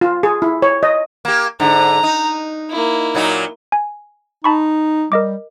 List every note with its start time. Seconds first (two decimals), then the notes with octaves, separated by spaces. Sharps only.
0.01 F4
0.23 G#4
0.42 E4
0.62 C#5
0.83 D#5
1.25 A#3 G4
1.60 G#2 D3 A#5
2.03 D#4
2.70 A#3 E4
3.15 A#2 F#3 D#4
3.72 G#5
4.44 D#4 A5 B5 C#6
5.12 G3 A#4 D#5 D6